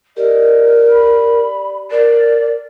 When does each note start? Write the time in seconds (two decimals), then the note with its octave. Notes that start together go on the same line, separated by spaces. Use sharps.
0.17 G4 A#4 D5 D#5
0.90 B5
1.91 A#4 D5